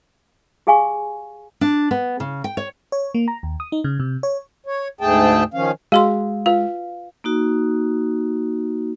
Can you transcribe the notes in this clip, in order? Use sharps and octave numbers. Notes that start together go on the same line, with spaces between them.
G4 G#4 F5 G#5 C#6
D4
B3
C#3
G5
C#5
C#5
A#3
A#5
D#2
D#6
D#4
C#3
C3
C#5
C#5
D2 G#2 A3 G#4 G5 A5
D#3 F3 C#4 F5
G#3 F#4 G#4 F5 C6 E6
F4 B4 F5
A#3 D#4 F#4